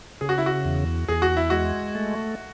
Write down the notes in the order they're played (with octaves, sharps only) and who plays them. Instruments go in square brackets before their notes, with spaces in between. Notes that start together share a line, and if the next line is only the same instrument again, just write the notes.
[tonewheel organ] C#3 [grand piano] G#4
[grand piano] F#4
E4
F#4
[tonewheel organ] E2
[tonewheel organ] E2 [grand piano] G#4
[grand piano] F#4
E4
[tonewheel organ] G#3 [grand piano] F#4
[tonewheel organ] A3